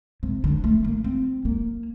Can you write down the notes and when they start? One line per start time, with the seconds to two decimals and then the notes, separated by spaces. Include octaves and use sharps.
0.23 C3
0.44 D3
0.64 A3
0.85 A#3
1.04 C4
1.45 A#3